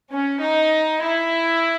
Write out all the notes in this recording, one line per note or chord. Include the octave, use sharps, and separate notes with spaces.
C#4
D#4
E4